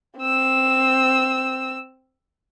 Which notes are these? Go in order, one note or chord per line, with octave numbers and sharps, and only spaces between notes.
C4 E6